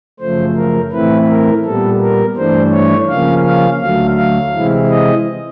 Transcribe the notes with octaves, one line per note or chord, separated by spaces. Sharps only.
F#2 C#3 F3 A3 C5
A#4
A2 E3 A3 C4 E4 B4
A#4
A#2 G3 B3 A4
A#4
G2 E3 A3 D4 C5
C#5
C#3 F3 A#3 C#4 F5
F5
D2 D3 F#3 A3 F5
F5
C3 E3 G#3 C4 E4
D#5